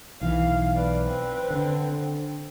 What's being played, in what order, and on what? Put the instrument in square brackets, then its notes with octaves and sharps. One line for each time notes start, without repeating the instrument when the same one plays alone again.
[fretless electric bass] B1 E3 [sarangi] F5
[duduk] B4 [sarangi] D5
[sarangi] C4
[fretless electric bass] D3